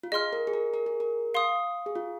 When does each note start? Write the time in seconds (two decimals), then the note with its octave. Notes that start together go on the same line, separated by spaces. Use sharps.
0.03 F4
0.12 G#4 D#5 C6 F6
0.33 A#4
0.47 G#4
0.53 A#4
0.74 A#4
0.86 G#4
1.00 A#4
1.34 F5 C6 D#6
1.86 G#4
1.95 F4